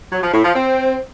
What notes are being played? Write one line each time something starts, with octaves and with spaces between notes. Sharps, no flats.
F#3
F3
A2
F3
C4